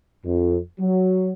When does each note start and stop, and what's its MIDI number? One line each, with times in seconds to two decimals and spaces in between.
0.25 0.58 41
0.80 1.31 54